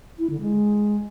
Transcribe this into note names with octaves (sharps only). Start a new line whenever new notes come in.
E4
D3
G#3